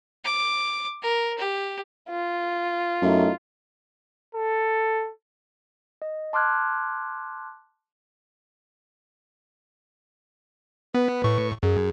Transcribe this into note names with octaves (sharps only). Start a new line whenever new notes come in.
D6
A#4
G4
F4
F#2 A3 D#4 E4
A4
D#5
A5 C6 D6 F6 F#6 G#6
B3 B4
A2 C#6
F#2 G#4